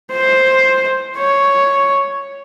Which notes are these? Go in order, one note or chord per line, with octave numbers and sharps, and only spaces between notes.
C5
C#5